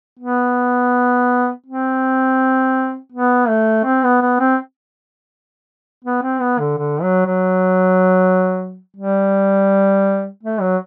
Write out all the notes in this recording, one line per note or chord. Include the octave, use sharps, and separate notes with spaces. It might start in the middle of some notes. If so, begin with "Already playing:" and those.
B3
C4
B3
A3
C4
B3
B3
C4
B3
C4
B3
D3
D3
F#3
F#3
G3
A3
F#3